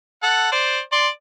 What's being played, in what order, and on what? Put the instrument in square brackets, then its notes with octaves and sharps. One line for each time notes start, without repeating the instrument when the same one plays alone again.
[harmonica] A4 F#5
C5 D5
D5 C6